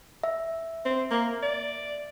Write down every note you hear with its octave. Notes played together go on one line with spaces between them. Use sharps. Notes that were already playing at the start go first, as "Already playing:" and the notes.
E5
C4
A#3
D5